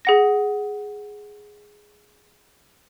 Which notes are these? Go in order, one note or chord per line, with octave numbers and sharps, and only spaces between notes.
G#4 F#5 A#6